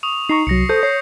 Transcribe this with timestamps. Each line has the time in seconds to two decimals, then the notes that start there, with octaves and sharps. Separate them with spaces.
0.03 C#6 D#6 F7
0.29 D#4 A#5 C#6 C7
0.47 C2 F#3 A#6 C#7
0.69 A4 C5 D#6 G6
0.83 C#5 C7